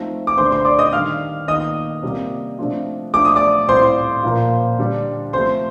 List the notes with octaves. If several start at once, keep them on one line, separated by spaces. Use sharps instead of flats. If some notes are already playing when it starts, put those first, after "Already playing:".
Already playing: F3 A3 C4 D#4
D6
D3 A3 D4 C5 C6
C5 C6
D5 D6
D#5 D#6
D#3 G3 D4 F5 F6
D#3 A#3 F4 D#5 D#6
C3 G3 A#3 F4
C3 F3 A3 D4 F4
F3 A3 D4 D6
D#6
D5 D6
A2 G3 C4 F4 C5 C6
A#2 F3 A#3
D3 G3 D4
C3 F3 A3 C5 C6